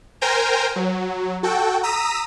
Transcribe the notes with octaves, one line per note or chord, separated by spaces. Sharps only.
A#4 C5 G5 G#5 A#5
F#3
F#4 A4 G5
A#5 D#6 E6 B6 D#7